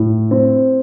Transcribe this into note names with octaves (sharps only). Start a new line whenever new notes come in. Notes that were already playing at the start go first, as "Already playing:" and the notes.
Already playing: A2
C4